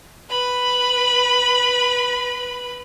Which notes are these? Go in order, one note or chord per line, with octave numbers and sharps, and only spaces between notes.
B4 B5